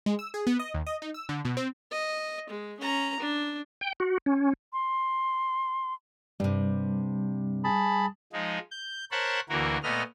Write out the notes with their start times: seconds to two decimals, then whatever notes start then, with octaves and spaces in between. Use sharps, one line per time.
0.06 G#3
0.19 E6
0.34 G#4
0.47 B3
0.59 D#5
0.74 D#2
0.87 D#5
1.02 D#4
1.14 E6
1.29 D3
1.45 B2
1.57 C4
1.91 D#5
2.50 G#3
2.80 C#4 A#5
3.20 D4
3.81 G5
4.00 F#4
4.26 C#4
4.73 C6
6.40 G2 C3 G3
7.64 G#4 A5 B5
8.33 F3 G#3 D#4
8.71 G6
9.11 A#4 C5 C#5 F#5 A5 B5
9.49 D2 E3 A#3 F#4 A#4
9.83 A#2 A3 B3 D#5 F6